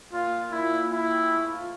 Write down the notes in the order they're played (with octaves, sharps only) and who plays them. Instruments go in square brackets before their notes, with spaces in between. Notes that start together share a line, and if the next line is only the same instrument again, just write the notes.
[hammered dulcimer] A#2 [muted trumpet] F4
[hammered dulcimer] A#2
[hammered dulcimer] A#2 [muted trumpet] E4
[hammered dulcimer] A#2
[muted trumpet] E4 [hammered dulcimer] G#4
[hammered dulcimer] C4
A3
F4